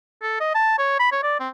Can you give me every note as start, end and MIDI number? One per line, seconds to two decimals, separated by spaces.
0.22 0.40 69
0.40 0.52 75
0.54 0.74 81
0.78 0.96 73
0.99 1.09 83
1.12 1.21 73
1.23 1.36 74
1.40 1.48 60